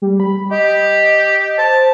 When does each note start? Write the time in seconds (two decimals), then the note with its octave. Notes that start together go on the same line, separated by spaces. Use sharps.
0.02 G3
0.20 B5
0.51 G4 D#5
1.58 C5 A5